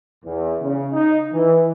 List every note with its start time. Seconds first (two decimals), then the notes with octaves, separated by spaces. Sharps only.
0.25 E2
0.62 C#3
0.92 D#4
1.32 E3